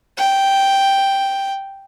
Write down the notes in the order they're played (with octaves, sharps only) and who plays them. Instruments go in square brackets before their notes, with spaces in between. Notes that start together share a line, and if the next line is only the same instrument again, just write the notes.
[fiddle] G5